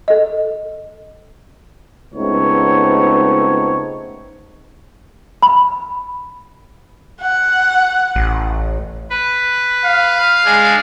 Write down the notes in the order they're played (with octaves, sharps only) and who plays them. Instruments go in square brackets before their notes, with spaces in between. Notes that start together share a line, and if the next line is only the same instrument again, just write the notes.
[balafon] A4 D#5
[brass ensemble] C#2 A3 B3 C4 D#4 C#5
[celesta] B5
[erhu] F#5
[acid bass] A1
[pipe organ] B4
[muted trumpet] F5
[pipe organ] G#3 D4 G#4